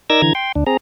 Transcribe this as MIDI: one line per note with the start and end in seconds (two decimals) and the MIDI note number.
0.10 0.22 63
0.10 0.22 70
0.10 0.22 74
0.10 0.22 88
0.10 0.22 92
0.10 0.22 94
0.22 0.33 50
0.22 0.33 52
0.22 0.33 82
0.22 0.33 92
0.35 0.52 79
0.35 0.52 84
0.55 0.64 38
0.55 0.64 62
0.67 0.77 60
0.67 0.77 68
0.67 0.77 82